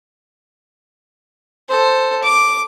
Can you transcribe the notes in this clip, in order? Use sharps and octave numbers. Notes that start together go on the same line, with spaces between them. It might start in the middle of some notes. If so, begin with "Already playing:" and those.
A4 C5
D6